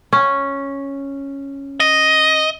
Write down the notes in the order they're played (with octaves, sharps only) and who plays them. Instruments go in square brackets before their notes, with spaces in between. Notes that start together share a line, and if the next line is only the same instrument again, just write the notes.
[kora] C#4
[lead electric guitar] D#5